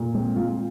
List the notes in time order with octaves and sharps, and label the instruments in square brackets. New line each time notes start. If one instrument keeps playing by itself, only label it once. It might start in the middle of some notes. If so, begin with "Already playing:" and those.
Already playing: [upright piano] A#2
[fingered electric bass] G#3 [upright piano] C4
[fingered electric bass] G#3 [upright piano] F4